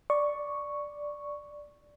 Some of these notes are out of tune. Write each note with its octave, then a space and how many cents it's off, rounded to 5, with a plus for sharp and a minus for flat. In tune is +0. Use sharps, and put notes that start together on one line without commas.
D5 +0 C#6 +0